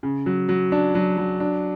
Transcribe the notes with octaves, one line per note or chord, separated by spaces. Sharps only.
C#3
F#3
F#3
D4
F#3
F#3
D4